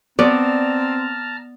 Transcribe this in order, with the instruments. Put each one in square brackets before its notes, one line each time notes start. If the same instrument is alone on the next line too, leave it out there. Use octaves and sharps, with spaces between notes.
[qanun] B3 [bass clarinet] C4 [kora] D5 [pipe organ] A5 A#5 F6